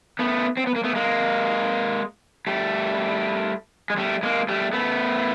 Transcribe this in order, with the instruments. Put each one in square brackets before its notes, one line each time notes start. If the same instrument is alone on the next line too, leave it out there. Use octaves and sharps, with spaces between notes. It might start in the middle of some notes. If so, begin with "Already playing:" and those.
[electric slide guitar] A3 B3
C4
B3
A#3
A3 B3
G#3 A#3
G3 A3
G#3
G3 A3
G#3 A#3
G3 A3
A3 B3